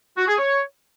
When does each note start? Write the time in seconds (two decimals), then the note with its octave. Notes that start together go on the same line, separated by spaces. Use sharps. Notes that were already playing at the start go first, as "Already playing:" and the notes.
0.18 F#4
0.28 G#4
0.38 C#5